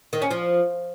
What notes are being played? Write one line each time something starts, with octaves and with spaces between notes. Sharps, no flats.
D#3
C#4
F3